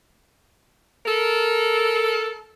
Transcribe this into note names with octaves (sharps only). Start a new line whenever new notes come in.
A4 A#4